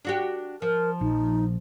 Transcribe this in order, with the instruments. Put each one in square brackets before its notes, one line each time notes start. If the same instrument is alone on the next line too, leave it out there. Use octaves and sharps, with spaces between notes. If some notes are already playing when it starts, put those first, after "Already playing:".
[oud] D4 F#4 G4
[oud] F3 [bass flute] A#4
[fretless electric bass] A#1 [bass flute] D#4